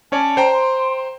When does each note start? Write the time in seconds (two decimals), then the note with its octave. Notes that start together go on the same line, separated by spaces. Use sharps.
0.12 C#4 C#5 D5 A5
0.37 C5 G5 A#5
0.52 C6